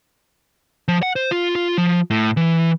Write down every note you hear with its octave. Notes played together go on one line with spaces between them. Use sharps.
F3
F#5
C5
F4
F4
F3
A2
E3